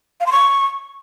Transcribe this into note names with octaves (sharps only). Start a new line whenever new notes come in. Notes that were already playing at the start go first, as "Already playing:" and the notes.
F5
C6
C#6